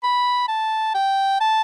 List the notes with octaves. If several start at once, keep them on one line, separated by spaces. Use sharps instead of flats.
B5
A5
G5
A5